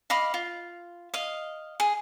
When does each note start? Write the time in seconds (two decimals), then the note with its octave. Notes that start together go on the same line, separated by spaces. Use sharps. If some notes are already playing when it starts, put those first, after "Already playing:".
0.10 D#5 F5 B5 D6
0.34 F4
1.14 D#5 F5
1.80 G#4